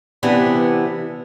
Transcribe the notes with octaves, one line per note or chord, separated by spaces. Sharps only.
C3 E3 B3 D4